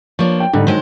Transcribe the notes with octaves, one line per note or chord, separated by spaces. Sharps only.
F3 A#3 D4 C#5
G5
G#2 D3 G3 D#4
D3 D#3 F#3 G#3 C5